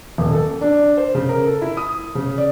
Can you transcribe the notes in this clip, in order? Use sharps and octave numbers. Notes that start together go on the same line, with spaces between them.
D#1
A4
D4
C5
C#3
A#4
A4
E4
D#6
C#3
D5